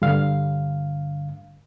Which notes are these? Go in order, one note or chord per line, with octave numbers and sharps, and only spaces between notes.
G2 D3 F5